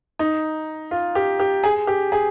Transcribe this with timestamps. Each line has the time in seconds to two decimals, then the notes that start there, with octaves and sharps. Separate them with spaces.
0.19 D#4
0.91 F4
1.15 G4
1.40 G4
1.64 G#4
1.87 G4
2.12 G#4